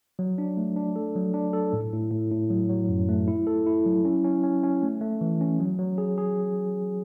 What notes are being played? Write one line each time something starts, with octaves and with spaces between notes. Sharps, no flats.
F#3
D4
A3
D4
A4
F#3
D4
A4
A2
A2
A2
A2
F#3
F#3
F#2
A3
E4
A4
E4
F#3
C#4
C#4
C#4
C#4
A3
A3
E3
C#4
F#3
F#3
G#4
G#4